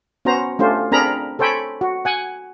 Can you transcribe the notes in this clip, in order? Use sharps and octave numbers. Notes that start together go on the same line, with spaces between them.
B3 C#4 F#4 C5 A#5
A3 C#4 D4 F4 G4 C5
C4 D4 G#4 A#4 A#5 B5
A4 C5 C#5 G5 G#5 B5
F#4
F#5 G#5